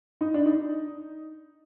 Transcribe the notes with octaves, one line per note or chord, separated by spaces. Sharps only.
D#4
D4
D#4